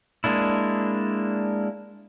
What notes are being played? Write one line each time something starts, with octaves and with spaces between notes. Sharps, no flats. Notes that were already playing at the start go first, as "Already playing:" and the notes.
G#3 A#3 D4 E4